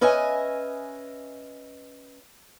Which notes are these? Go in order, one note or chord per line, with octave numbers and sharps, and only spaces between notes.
C#4 B4 D#5 E5 G#5